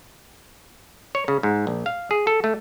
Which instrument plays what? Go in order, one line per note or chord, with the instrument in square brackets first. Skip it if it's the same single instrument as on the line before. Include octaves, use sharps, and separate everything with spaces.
[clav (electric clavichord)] C#5
C#3
G#2
A#1
F5
G#4
A4
A3